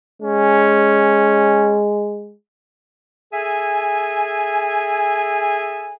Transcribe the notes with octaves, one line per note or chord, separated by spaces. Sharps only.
G#3 C#4
G#4 A4 E5 G#5